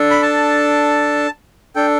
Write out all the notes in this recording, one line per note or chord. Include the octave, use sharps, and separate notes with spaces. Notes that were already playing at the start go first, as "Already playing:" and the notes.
Already playing: D4 A4
B5
A5
D4 A4 G5